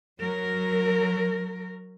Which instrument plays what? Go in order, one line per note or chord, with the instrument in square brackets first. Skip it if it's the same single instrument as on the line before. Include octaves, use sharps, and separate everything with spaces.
[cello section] F#3 A#4